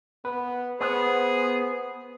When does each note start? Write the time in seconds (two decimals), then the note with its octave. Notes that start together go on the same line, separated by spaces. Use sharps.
0.25 B3 B4
0.81 B3 G#4 C5